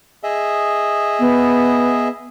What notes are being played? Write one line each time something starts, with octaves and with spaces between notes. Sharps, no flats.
G#4 D#5 E5
B3